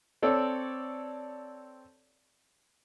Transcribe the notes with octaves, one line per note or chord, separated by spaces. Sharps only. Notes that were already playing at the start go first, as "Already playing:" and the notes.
C4 A4 C#5 D5